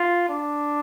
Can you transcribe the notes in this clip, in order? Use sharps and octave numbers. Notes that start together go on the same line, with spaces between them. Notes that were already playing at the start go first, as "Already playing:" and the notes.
Already playing: F4
D4